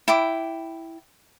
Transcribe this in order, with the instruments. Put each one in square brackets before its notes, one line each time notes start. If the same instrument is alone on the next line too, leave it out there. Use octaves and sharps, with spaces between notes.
[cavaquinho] E4 G5 D6